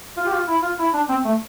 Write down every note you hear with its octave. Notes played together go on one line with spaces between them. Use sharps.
F4
G4
F4
E4
F4
E4
D4
C4
A3